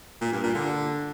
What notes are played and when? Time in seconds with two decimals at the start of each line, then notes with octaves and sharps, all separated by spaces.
0.22 A#2
0.33 G2
0.44 A#2
0.55 D3